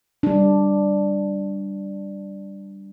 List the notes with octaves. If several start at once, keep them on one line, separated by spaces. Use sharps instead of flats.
G3 D4